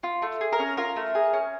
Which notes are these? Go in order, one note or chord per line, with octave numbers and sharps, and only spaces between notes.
F4
A3
G#4
A#4
C#4
F4 A#4
A3
G#4
C#4